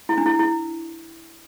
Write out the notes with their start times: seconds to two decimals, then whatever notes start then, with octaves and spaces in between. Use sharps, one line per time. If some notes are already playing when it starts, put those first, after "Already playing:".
0.09 E4
0.18 D4
0.26 E4
0.39 E4